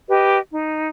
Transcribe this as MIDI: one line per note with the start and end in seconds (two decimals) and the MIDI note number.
0.08 0.37 67
0.08 0.37 71
0.08 0.37 75
0.50 0.89 63